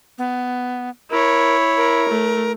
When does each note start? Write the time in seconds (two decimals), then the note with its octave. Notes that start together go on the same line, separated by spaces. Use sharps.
0.18 B3
1.10 E4 A#4 C#5
1.77 A#4
2.09 A3